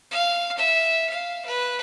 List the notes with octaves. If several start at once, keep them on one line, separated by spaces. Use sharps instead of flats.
F5
E5
F5
B4